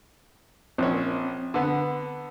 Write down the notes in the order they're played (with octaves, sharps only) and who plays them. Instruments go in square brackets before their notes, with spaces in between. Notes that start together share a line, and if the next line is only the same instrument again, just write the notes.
[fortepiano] A#1 C#4 [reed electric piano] C4
[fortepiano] D3 B3